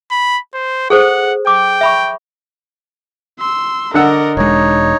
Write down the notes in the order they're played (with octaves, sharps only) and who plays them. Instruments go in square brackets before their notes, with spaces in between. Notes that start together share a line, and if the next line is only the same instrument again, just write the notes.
[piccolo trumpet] B5
C5
[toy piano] G#4 A4 C5 [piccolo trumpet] F#5
[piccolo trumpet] G5 [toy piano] D6
[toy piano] E5 B5 C#6
[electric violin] C6 E6
[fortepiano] D3 F#5 E6 [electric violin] A#4 D#5 [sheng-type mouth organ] D5
[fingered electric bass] E1 G#3 [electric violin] D4 [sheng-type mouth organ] D#4 C#5